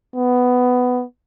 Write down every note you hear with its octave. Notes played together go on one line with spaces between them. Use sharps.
B3